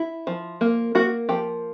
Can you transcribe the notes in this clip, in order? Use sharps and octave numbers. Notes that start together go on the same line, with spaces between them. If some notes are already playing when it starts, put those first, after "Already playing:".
Already playing: E4
F3
A#3
A#3 F#4
F3 G4